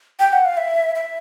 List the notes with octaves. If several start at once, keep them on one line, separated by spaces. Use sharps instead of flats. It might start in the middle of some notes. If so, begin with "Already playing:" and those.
G5
F#5
F5
E5
E5